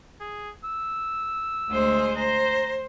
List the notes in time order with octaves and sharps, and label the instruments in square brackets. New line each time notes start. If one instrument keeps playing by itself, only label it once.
[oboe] G#4
E6
[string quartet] D2 G#3 C5
[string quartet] C5 [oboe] A#5